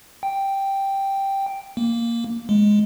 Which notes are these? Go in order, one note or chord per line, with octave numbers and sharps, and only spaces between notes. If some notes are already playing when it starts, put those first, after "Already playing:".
G5
A#3
G#3